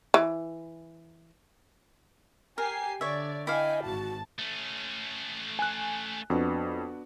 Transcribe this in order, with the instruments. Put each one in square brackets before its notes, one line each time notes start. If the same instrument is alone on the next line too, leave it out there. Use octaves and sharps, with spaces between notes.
[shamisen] E3
[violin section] G4 G#5 C7 [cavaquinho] A#4
[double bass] D3 [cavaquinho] C#5 E5 [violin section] D5
[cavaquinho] E4 D5 F5 [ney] D#5 [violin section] G5 G#5
[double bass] G#1 [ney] F#4 [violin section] A5
[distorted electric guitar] A3 C#4
[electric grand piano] G#5 F#6
[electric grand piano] F2 [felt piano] B3 D4 F#4